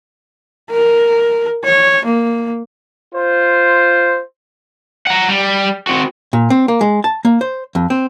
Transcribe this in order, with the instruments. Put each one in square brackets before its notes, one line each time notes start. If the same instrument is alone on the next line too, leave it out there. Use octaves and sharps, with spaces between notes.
[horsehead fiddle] A#4
C#5
A#3
[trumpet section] F4 C5
[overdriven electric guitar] F#5 A#5
G3
C4 F#4
[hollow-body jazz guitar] A#2
C4
A#3
G#3
A5
A#3
C5
F2
C4